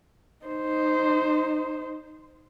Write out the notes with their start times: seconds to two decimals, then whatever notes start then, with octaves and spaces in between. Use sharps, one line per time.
0.46 D#4 C5